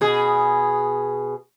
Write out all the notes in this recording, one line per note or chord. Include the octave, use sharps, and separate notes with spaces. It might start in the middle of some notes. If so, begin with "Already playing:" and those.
B2 G#4